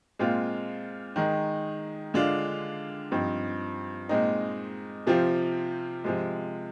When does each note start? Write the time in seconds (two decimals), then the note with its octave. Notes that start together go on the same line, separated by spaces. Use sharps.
0.19 A#2 G#3 C4 F4
1.16 D#3 G#3 D#4
2.14 D3 G#3 D4 F4
3.11 G2 F3 C4 D#4
4.09 A#2 G#3 C4 D#4
5.07 C3 F3 C4 F4
6.04 C3 F3 G#3